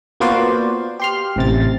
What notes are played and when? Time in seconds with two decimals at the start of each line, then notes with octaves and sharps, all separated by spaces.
0.20 A#3 B3 F4 F#4 C5 D5
0.99 G4 C6 F6
1.36 A1 C3 A6